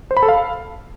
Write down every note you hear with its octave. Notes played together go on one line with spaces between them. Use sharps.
C5
B5
A4
F5